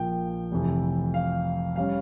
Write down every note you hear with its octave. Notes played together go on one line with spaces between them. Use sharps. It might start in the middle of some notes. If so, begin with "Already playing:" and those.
Already playing: A#1 A#2 F3 A#3 G5
F1 F2 E3
F5
G3 C#4 F5